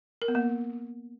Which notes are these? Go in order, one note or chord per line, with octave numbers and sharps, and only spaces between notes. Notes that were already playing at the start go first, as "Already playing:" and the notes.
A#4
B3
A#3